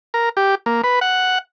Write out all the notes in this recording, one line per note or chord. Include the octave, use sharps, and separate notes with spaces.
A#4
G4
A#3
B4
F#5